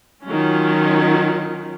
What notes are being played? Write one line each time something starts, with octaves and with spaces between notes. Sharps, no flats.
D#3 F#3 C#4 F4